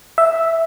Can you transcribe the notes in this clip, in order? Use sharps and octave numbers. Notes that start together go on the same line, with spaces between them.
E5